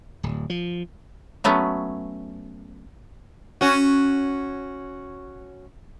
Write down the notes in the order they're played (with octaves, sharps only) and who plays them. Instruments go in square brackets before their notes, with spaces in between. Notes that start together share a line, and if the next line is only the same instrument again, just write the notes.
[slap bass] D1
F3
[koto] F#3 A3 B3 C#4
[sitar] C#4 F#4